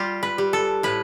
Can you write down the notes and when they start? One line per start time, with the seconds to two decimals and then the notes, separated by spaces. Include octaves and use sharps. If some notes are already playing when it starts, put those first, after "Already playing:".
Already playing: G3 F4 G4
0.23 B4
0.38 G3
0.53 A4
0.83 A2 B4